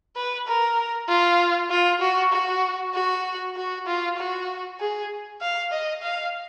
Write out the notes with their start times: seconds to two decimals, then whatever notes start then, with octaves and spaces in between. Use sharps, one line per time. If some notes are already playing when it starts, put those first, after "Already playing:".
0.16 B4
0.47 A#4
1.08 F4
1.70 F4
2.00 F#4
2.32 F#4
2.94 F#4
3.56 F#4
3.87 F4
4.17 F#4
4.80 G#4
5.41 F5
5.72 D#5
6.02 F5